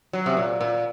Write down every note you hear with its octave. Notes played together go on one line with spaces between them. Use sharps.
F#3
C3
A#2
A#2